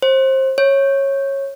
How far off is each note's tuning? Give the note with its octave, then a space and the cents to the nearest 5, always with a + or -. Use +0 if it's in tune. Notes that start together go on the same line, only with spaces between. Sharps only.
C5 +25
C#5 -15